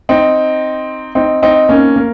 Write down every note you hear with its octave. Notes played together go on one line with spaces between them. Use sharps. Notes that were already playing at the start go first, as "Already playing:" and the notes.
C4 D#4
C4 D#4
C4 D#4
A#3 C#4
A#3